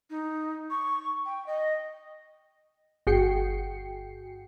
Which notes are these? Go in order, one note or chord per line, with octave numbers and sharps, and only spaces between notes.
D#4
C#6
G5
D#5
G1 F#4 G#4 G5 C7 C#7